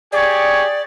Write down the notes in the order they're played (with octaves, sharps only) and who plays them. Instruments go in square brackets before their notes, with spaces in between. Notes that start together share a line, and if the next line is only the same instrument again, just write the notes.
[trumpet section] G4 G#4 C#5 [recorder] D5